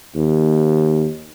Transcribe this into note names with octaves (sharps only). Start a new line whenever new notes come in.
D#2